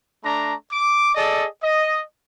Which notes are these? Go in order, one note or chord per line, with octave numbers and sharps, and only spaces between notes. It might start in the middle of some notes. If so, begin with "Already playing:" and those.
A3 D4 A#5
D6
G#4 A4 D5 D#5
D#5